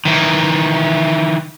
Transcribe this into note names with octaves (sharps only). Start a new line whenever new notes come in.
D#3 E3